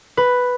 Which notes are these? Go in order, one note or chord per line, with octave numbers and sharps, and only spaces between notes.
B4